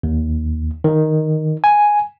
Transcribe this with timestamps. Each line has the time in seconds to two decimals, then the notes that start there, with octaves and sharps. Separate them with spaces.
0.03 D#2
0.84 D#3
1.64 G#5